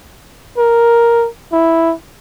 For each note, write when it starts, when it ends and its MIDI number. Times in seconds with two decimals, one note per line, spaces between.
0.58 1.28 70
1.53 1.93 64